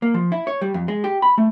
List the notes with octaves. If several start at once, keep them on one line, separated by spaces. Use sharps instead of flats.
A#3
F3
E4
C#5
G3
F2
G#3
G4
B5
A3